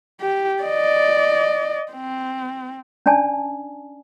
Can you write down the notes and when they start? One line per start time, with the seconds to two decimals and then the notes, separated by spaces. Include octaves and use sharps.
0.21 G4
0.63 D5 D#5
1.92 C4
3.06 C#4 D4 D5 G#5 A5